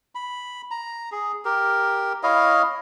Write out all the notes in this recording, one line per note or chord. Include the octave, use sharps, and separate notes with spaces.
B5
A#5
G#4
G4 A#4
E4 C#5 D#5 F5